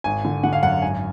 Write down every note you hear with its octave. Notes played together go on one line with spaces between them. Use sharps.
G#1 G#5
D3
D3 F#5
F5
F#2 F#5
G#1 G#5